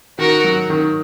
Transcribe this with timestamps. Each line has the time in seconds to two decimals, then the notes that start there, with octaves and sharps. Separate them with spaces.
0.19 D#3 F#4 A#4
0.44 F#3
0.70 D#3